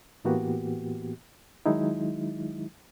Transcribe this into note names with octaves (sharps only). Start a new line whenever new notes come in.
A2 E3 A#3 B3 F#4 G4
D#3 F#3 G#3 D#4 E4